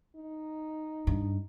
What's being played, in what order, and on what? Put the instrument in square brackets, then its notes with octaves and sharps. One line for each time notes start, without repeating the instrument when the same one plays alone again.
[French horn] D#4
[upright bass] G2